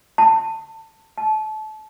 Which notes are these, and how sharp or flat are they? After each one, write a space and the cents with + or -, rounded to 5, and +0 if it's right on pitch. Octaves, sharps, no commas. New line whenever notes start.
A5 +20
A5 -30